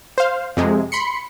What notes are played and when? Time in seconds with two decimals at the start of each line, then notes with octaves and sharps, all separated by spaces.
0.18 C5 F5
0.57 F2 C3 G#3
0.92 B5 C6 C#7